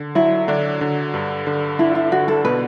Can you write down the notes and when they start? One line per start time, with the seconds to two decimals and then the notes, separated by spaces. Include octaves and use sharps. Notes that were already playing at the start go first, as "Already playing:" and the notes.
Already playing: D3
0.15 F#3 E4
0.48 D3 D4
0.81 D3
1.14 G2
1.47 D3
1.79 D4 E4
1.95 E4
2.12 D3 F#4
2.28 A4
2.44 B2 B4